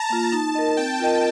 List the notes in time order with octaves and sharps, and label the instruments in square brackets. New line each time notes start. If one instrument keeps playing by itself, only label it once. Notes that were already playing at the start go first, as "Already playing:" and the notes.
Already playing: [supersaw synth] A5 A#5
[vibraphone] A#3 F4
[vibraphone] D#4 [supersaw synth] A5
[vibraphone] A#4 D#5
[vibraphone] C4 [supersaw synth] G5
[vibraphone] F4 A#4 D#5